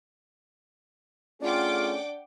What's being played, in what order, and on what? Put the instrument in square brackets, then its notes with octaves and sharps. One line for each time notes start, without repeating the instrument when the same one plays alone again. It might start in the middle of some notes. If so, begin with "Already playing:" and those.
[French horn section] A3 C#4 G#4 [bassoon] D4 [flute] F4 [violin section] F#5 G5 D6